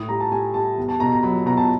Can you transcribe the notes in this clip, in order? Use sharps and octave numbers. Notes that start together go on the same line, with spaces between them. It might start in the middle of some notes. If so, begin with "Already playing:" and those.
Already playing: A2 D#6
G3 A#5
A5
G3 G#5
G3 A5
E2
A5
B2 A#5
A#5
F#3 B5
B2 A#5
A5